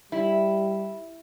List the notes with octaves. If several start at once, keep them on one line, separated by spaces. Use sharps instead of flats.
G3 E4